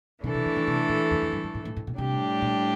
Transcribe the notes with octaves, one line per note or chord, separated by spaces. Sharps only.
C3 E3 A3 D4 A4
C3
D3
D3
C3
A#2
E2
F2
G2
G2
A2
A2
A2
A#2
A2 C3 G3 D4 G4
A#2